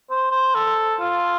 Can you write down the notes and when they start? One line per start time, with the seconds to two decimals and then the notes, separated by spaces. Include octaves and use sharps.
0.10 C5
0.32 C5
0.55 A4
1.00 F4